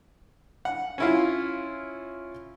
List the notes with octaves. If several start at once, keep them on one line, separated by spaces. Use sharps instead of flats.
F#5
C#4 E4 F4